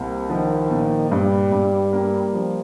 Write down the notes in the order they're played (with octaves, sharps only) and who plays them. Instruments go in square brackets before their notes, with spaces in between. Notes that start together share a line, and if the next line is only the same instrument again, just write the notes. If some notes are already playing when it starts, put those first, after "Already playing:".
Already playing: [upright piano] C2 A#3 [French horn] C3
[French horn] D#3 [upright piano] F3
[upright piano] A#2
[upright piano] G2 [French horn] G3
[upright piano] G2
A#3
F3